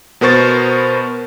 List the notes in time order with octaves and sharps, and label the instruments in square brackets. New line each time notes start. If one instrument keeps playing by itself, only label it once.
[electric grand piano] B2 B3 A#4 C5 C#6 A6